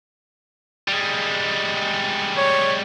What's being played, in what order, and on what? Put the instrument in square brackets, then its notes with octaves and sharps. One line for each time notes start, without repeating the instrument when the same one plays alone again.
[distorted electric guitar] G3 G#3
[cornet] C#5